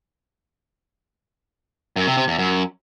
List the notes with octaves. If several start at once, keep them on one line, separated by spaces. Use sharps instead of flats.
F#2
C3
C3
E2
F#2